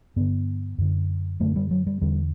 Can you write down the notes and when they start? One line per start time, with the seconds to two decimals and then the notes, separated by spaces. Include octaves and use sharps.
0.16 G2 D3 B3
0.78 F#2 D3
1.40 F#2 D3 A3
1.56 G3
1.71 F#3
1.87 G3
2.01 E2 D3 G3